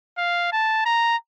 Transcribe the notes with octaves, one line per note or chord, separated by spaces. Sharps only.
F5
A5
A#5